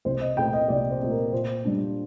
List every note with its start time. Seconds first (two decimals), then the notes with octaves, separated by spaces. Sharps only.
0.05 C2 C5
0.21 D#5
0.37 A#2 A3 C4 G5
0.53 D#5
0.69 C2 D5
0.90 C5
1.01 A#2 A3 C4
1.11 A#4
1.32 A#2 C5
1.64 G3 D4